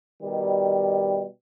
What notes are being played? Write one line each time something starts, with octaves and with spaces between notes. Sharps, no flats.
B2 D#3 G3